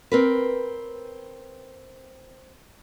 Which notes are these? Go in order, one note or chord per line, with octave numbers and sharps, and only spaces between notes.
C4 A#4 B4